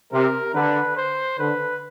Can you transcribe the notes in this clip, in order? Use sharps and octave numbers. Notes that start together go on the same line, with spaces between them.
C3 A#4
D3 B4
C5
D3 B4